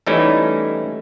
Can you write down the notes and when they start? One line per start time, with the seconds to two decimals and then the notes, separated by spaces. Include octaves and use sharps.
0.07 E3 G3 A3 C#4 D#4 E4